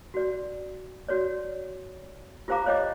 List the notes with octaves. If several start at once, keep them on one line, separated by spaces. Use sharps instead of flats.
F#4 D5
F#4 C#5 D5
F4 G4 C5 F5 A#5 D6
C5 C#5 D#5 G5 D6